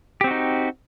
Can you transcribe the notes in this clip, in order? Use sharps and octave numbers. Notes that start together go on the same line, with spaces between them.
C4 D#4 F#4 G4